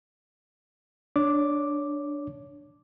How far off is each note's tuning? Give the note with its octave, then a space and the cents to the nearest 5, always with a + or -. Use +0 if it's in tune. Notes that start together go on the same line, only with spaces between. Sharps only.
D4 +0 C#5 +15 D6 +0